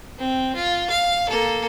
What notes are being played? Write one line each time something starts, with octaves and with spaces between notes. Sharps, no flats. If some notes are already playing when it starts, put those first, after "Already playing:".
C4
F4
F5
A#3 A4